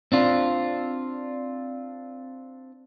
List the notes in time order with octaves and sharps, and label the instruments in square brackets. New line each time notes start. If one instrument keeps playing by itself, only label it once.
[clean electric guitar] C4 D4 F4